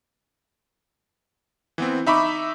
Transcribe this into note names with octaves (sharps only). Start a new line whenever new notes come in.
E3 B3 C4
D#4 E5 B5 C#6 D6